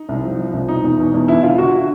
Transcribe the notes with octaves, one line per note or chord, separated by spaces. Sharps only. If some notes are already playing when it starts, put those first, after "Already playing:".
Already playing: D#4
C2
F3
F3
C2
B2 D#4
E2
B2
E2
D3 E4
D3 F4
D3 F#4